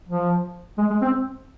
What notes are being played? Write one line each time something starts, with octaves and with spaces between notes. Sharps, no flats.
F3
G#3
G#3
C4